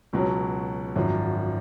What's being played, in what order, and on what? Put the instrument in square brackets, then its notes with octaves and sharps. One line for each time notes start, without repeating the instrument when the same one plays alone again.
[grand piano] C#2 B2 F#3
G#1 F#2 F3